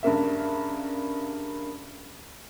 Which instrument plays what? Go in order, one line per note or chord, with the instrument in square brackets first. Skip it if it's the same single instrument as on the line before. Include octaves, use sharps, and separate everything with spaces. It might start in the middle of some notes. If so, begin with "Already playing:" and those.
[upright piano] G2 C#3 A#3 E5